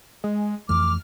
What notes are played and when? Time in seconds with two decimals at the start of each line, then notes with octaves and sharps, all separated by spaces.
0.24 G#3
0.69 F2 E3 A3 D6 F6